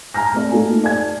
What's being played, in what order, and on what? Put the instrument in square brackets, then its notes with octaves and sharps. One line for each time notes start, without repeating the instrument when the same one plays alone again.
[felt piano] G#5 A#5 F6 A#6
A3 C4 D5
A3 A#3 D#4 A4 G#5
D5 G#5 G#6